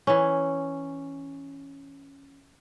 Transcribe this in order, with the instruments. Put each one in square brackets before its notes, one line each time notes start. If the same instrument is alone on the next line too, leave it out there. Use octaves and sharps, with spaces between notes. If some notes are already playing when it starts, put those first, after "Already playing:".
[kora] E3 C#4